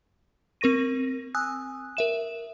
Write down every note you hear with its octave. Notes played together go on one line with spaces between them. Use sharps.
C4 A#4 C#6 A#6 D#7
G#5 D#6 E6 F#6
A#4 E5 E7